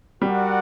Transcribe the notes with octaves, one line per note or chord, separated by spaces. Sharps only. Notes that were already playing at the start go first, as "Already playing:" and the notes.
G3 F#4 A#4 D5 F#5